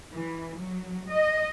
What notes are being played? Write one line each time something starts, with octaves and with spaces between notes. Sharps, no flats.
E3
F#3
D#5